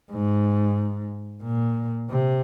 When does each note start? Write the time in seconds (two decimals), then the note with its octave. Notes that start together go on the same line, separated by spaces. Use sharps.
0.11 G#2
1.43 A#2
2.10 C3